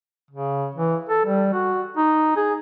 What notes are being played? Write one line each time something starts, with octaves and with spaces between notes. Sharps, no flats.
C#3
E3
A4
G3
F#4
D#4
G#4